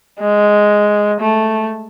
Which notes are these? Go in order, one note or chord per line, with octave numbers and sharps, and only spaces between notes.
G#3
A3